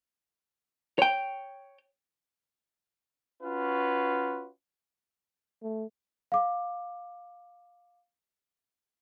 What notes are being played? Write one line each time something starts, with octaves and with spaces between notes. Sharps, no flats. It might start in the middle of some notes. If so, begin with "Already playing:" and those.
C#5 G5
C#4 F4 F#4 B4
A3
F5 D6